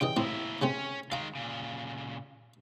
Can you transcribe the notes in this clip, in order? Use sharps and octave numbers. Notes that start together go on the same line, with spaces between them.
C#3 E3 D#5 G5
A2 A#3 C4 E4
C#3 A3 C4 C#4
D#3 G#3 F5 A#5
A#2 C#3